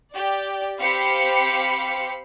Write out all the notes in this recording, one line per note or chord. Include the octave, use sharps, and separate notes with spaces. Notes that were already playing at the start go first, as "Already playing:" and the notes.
G4 D5
C4 G4 C5 F5 B5 C#7